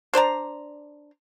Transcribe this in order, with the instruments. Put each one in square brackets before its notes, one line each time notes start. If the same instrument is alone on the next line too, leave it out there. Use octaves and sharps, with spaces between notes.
[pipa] D4 C5 D5 A#5